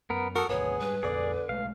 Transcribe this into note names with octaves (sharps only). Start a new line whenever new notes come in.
F#2 B3 A#4
F#4 A4 A#4 D#6
G#1 D2 B3 G#4 C#5
G#2 G3 B4
A#1 F2 D3 B3 G#4 D5
B1 G#3 A3 F5